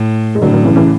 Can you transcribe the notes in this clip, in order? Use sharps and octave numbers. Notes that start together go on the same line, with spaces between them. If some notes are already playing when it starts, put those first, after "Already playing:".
Already playing: A2
G#3
A2 D3 F#3
D3 F#3
C#3 E3
C#3 E3